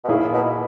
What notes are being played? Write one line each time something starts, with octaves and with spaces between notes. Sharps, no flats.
B2
A#2 C#3 A#3 E4 G#4
B2